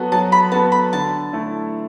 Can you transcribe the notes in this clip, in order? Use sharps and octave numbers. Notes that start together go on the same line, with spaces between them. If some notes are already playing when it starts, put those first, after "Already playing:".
Already playing: F#3 B3 F#4 A4
F#3 A5
B5
B3 F#4 A4 A5
B5
D3 A5
A3 E4